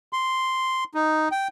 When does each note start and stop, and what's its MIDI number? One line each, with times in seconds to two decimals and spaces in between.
0.13 0.84 84
0.94 1.29 63
1.32 1.48 79